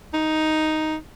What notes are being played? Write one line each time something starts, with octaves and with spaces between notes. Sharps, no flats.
D#4